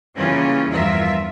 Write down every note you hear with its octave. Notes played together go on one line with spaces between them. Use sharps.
C#3 E3 G3 A#3 C#4 F4
E2 G2 F3 F4 A#4 E5